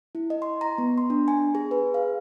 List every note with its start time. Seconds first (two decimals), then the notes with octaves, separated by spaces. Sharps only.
0.15 E4
0.30 D#5
0.42 C6
0.61 A#5
0.78 B3
0.98 C6
1.10 D4
1.28 G#5
1.55 G#4
1.71 B4
1.94 F5